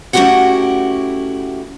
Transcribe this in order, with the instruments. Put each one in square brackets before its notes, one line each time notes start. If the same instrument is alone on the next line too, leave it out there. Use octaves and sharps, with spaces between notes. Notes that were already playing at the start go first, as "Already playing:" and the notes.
[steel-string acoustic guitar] A3 C#4 E4 F#4 G4 F#5